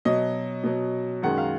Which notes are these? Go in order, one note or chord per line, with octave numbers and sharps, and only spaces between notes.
B2 F#3 D#5
B2 F#3
F#2 D#3 G#3 F#5
F5